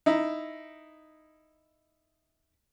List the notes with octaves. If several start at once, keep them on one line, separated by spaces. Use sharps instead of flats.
D#4 E4